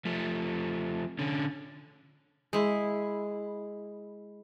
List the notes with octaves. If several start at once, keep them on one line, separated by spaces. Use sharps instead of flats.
F3 A3
D3 C#4
G#3 E4